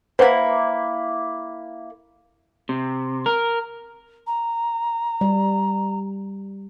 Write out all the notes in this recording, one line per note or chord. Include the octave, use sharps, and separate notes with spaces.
A#3 E4 B4 C5 F#5
C3
A#4
A#5
G3